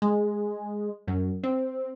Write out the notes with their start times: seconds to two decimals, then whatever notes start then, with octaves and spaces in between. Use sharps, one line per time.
0.02 G#3
1.07 F#2
1.43 C4